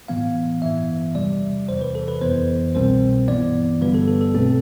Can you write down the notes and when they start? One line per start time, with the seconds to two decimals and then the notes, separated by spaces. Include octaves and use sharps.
0.08 A2 E3 B3 F5
0.62 G2 E3 B3 E5
1.15 E2 C3 G3 D5
1.69 E2 C3 E3 C5
1.81 B4
1.95 A4
2.08 B4
2.21 F2 E3 B3 C5
2.75 C2 B2 G3 C4 C5
3.28 G2 E3 B3 D5
3.81 G1 G2 D3 G3 B3 B4
3.94 A4
4.08 A4
4.21 A4
4.34 B1 B2 A3 C4